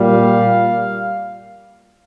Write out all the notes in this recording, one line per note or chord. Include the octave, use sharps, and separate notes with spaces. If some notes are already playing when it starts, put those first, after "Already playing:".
Already playing: A#2 G3 F5